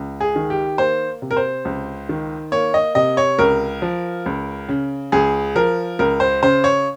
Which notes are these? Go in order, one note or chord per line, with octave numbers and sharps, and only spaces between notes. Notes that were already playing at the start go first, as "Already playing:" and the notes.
Already playing: C#2
G#4
D#3
G4
A#3 C5
C3
A#4
C5
C#2
D#3
A#3 C#5
D#5
C3 D#5
C#5
C#2 A#4
F3
C#2
C#3
C#2 G#4
F3 A#4
C#2 A#4
C5
C#3 C5
C#5